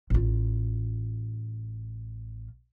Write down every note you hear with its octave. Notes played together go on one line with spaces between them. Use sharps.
A1 F4